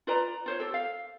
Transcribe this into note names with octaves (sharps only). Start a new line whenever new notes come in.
F4 B4 D5 A#5
F4 C5 C#5
G4 A4
F5